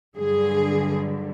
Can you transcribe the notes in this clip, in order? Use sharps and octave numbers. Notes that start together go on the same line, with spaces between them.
G2 D3 F#3 G#4